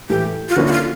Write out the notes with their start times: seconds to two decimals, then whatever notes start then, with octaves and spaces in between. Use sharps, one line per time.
0.10 A2 E3 A3 G4
0.49 F4
0.56 D3 F3 A#3 C#4 E4 F#4
0.66 F#4
0.72 F4